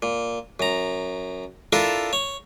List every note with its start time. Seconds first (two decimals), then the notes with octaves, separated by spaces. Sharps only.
0.02 A#2
0.60 F#2 A#5
1.72 D4 E4 F4 A4 A#4
2.13 C#5